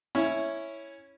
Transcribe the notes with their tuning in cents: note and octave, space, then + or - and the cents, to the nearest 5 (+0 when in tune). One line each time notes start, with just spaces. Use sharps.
C#4 +0 E4 +0